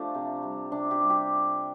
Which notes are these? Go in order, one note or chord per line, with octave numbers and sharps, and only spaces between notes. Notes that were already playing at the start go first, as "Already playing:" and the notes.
Already playing: F3 A3 D4 F4 G4
C3
G3
C3 D4
G4
G3
G4